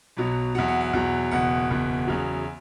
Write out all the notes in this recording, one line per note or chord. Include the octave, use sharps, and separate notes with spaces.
B1 B2 F#3
E2 B2 F#3 F#5
F#5
F#5
E2 B2 F#3
F#1 E2 B2 F#5
F#1 E2 B2
E2 C#3 F#3